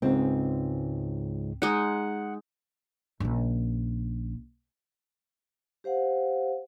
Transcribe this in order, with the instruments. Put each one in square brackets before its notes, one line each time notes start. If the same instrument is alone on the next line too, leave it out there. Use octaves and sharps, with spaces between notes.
[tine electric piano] C#2 G#2 [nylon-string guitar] C4
[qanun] G#3 D#4 [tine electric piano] F#5
[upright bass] A#1 C#3
[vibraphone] G4 C5 F5 F#5